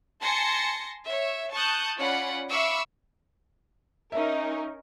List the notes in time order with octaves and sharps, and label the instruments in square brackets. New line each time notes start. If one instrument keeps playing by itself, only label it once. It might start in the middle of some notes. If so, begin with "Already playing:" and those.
[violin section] G#5 A5 C6 A#6 C#7
C#5 E5
A5 C#6 D#6 F#6 G6
C#4 F4 D5 F#5 B5
E5 F5 B5 C#6 D6 E6
[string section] C#4 D#4 A#4 [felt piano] E5